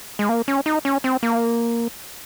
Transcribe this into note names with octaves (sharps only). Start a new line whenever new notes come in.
G#3
A#3
C#4
D#4
C#4
C4
A#3